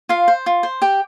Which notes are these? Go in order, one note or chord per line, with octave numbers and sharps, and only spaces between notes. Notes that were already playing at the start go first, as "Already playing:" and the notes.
F4 F5
C5
F4
C5
G4 G5